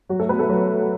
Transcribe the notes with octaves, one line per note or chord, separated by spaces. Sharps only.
F#3 F#4
A3 A4
B3 B4
A3 A4
F#3 F#4